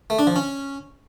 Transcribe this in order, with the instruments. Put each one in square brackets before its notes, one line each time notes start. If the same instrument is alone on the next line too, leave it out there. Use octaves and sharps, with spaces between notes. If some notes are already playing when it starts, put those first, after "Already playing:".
[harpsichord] A3
D4
F3
C#4